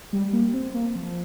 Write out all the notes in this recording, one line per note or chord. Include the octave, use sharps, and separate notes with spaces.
G3
A#3
C4
A#3
F3